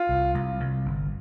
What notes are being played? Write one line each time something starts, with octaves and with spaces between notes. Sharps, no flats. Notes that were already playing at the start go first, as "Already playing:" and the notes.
Already playing: F4
C2
C2
C2
G1